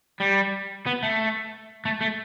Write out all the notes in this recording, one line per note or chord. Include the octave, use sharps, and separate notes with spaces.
G3
B3
A3
A3
A3